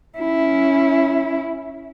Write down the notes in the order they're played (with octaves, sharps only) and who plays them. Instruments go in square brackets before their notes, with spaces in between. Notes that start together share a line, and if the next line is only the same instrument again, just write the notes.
[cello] C#4 E4